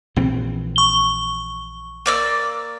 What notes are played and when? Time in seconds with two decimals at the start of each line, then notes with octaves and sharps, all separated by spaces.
0.16 A#1 E3 C4
0.76 C#6 G7
2.06 A#3 D5 E6